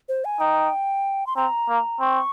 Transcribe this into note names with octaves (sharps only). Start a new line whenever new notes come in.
C5
G#5
D#4 G5
C6
C4 A#5
A#3
C4 C#6